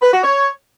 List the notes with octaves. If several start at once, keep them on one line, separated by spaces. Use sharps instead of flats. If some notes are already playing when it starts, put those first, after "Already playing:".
B4
F#4
C#5